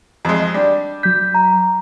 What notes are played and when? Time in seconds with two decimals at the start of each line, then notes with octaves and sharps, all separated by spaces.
0.25 F2 G#3
0.54 G3 D4
1.03 F#3 G6 B6
1.34 A#5